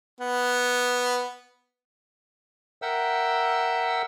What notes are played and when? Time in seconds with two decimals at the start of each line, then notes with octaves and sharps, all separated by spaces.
0.20 B3
2.82 A#4 E5 F#5 G5 E6